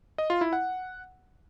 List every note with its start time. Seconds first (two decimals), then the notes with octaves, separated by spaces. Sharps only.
0.18 D#5
0.30 F4
0.41 E4
0.53 F#5